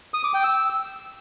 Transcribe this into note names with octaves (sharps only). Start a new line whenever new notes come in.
D#6
D6
G5
E6